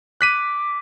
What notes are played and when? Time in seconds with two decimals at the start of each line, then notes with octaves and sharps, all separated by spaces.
0.21 D6 F#6 B6 D#7